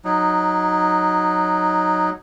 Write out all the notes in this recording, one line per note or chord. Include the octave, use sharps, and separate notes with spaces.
F#3 D#4